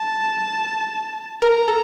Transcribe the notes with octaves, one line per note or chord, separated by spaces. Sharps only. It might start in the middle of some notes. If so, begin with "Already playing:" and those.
Already playing: A5
A#4 A#5
A4